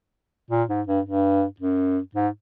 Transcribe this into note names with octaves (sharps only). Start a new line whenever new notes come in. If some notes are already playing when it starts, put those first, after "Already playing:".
A#2
G#2
G2
G2
F#2
G#2